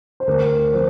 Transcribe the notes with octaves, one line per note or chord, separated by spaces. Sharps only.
C5
D2 A#4
C3 F3 C5